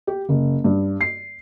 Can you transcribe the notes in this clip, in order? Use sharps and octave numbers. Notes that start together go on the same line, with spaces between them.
G4
F#1
G2
C7